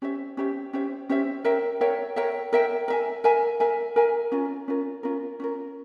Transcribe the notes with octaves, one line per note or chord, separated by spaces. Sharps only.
C#4 G4 C5 E5
C#4 G4 C5 E5
C#4 G4 C5 E5
C#4 G4 C5 E5
A#4 C#5 E5 G5
A#4 C#5 E5 G5
A#4 C#5 E5 G5
A#4 C#5 E5 G5
A#4 E5 G#5
A#4 E5 G#5
A#4 E5 G#5
A#4 E5 G#5
C#4 F4 A#4
C#4 F4 A#4
C#4 F4 A#4
C#4 F4 A#4